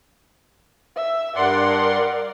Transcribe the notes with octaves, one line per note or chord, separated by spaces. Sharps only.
E5
G2 A#4 D5 F#5 C6